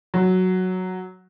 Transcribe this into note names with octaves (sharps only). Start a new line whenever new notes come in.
F#3